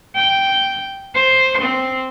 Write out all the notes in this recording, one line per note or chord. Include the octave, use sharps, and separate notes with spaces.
G5
C5
C4